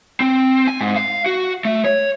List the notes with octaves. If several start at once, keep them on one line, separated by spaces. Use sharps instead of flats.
C4
G#5
G#2
F5
F#4
A3
C#5